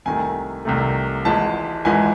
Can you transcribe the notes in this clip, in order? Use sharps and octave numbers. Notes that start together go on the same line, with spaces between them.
C2 C3 D#3 A3 G#5
C2 C3 D#3 A3
G#1 G#2 E3 G#3 A5
G#1 G#2 E3 G#3 G#5